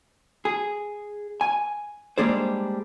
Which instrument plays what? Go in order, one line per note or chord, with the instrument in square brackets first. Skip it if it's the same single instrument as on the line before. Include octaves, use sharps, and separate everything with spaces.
[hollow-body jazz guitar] G#4
G#5
G3 G#3 A#3 D4 G#4 C5